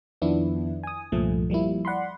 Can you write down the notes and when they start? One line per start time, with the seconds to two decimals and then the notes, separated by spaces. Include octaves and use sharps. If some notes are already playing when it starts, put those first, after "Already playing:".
0.22 F2 D#3 F3 B3 D4 E4
0.83 G#5 D#6
1.12 C2 G2 A#2 F3 A3
1.50 F3 G3 A#3 E4
1.85 D5 F#5 B5 C6